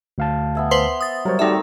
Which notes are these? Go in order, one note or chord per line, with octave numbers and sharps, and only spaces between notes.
D2 F5 A5
B3 E5 G#5
B4 C5 C6
D#6 A6
F#3 G3 A#4 C5 C#5
D#3 G3 A3 C4 D#4 F#4 D5 E5